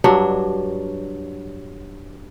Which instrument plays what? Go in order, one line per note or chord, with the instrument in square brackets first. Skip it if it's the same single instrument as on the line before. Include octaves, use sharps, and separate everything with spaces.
[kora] G2 F#3 D4